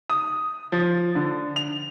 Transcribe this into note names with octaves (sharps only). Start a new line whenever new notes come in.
D#6
F3
D3
F7